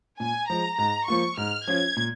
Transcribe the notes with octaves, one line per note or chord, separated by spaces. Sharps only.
A#2 G#5
F3 G#3 A#5
G#2 A#5
F3 A#3 F4 C#6
G#2 F6
F3 C#4 F4 G#6
A#2